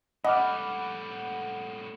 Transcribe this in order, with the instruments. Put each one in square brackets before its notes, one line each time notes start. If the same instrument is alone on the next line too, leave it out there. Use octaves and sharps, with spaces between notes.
[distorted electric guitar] A2 G3 [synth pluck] D#5 [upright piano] F#5 [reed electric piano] B5 D6 F6